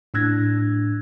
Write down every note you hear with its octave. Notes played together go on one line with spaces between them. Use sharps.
A2 D4 E6 F#6 G#6 A#6